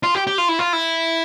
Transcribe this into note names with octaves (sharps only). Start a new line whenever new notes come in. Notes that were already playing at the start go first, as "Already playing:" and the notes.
F4
G4
G4
F4
E4
F4
E4